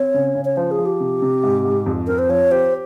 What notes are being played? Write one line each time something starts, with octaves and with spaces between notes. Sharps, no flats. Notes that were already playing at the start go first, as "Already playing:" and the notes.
Already playing: C4 C#5
C#3
C#3
C#5
F3 C5
G#4
F3
G4
C3
C3
G#2
G#2
F2
C4 A#4
C5
F3 C#5
G4 C5